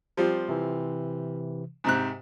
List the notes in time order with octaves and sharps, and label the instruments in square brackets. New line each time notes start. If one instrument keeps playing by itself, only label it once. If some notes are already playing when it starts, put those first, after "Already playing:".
[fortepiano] F3 G3 C4
[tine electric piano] C3 E3
[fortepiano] G#2 C3 F#6